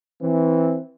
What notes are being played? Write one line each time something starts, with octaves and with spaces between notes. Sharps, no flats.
E3 C4